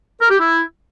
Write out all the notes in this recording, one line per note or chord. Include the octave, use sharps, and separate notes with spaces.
A#4
G4
E4